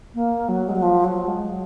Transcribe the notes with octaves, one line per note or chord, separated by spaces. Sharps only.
A#3
F#3
G#3
F#3
F3
F#3
G#3
F#3